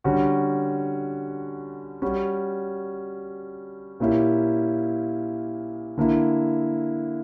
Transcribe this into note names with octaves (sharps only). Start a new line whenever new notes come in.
D3 G3 C#4 F#4
G3 C#4 F#4
A#2 A#3 C#4 E4 G4
D3 A#3 E4